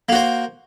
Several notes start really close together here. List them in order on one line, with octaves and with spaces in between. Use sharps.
A#3 F#4 C5